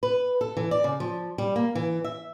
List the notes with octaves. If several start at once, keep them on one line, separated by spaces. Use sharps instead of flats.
B4
A4
E3
D5
C#3
F3
G3
A#3
E3
E5